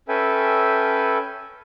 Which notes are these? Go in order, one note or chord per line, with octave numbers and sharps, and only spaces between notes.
C#4 A4 B4 E5 G5 G#5